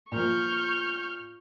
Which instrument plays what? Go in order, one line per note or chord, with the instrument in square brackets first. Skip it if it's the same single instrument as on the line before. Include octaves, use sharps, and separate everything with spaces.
[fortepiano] A#2 F3 [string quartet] C#6 F6 G6